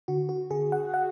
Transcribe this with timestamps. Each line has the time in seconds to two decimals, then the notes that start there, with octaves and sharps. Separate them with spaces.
0.08 D3 F#4
0.29 F#4
0.51 D3 G#4
0.72 F#5
0.94 F#5